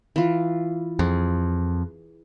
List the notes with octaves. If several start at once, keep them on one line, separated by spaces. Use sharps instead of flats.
E3 F4
F2 G#4